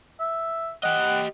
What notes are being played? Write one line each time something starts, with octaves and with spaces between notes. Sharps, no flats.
E5
G4 D#5 F#5